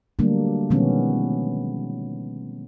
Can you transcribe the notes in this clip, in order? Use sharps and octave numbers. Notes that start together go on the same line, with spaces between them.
D3 F#3 G3 A3 A#3 D4
B2 D#3 F3 G#3 B3 C#4